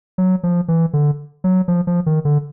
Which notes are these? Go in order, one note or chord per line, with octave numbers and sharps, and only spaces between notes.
F#3
F3
E3
D3
F#3
F3
F3
D#3
D3